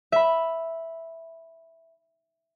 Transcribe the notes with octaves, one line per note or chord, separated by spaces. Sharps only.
E5 B5